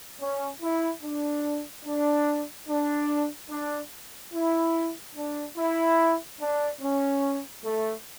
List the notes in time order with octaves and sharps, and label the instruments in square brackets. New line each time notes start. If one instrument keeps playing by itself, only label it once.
[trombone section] C#4
E4
D4
D4
D4
D4
E4
D4
E4
D4
C#4
A3